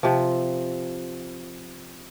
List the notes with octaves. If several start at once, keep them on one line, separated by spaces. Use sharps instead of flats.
C3 F3